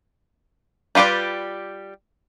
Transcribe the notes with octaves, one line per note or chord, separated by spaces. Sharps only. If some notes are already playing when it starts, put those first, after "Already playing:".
G3 F4 G4 B4 D5